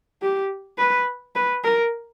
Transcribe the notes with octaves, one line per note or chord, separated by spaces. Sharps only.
G4
B4
B4
A#4